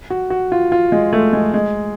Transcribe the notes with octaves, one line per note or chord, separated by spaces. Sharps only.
F#4
F#4
F4
F4
G#3
A3
G#3
G#3